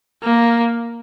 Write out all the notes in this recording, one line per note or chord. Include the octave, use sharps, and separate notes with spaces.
A#3